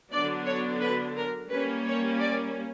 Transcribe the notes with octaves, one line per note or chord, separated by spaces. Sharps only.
D3 F#3 B3 D4 D5
C#5
B4
A#4
G3 A#3 C#4 B4
C#5
D5